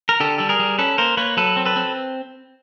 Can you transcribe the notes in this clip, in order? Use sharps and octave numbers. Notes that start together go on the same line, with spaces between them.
A#4
D3 G4 A4
G3 A4
G#4 A#4
G3
C#4 A4 B4
A#3 A#4 C5
A#3 B4 C#5
F#3 A4 B4
C4
A4 B4
C4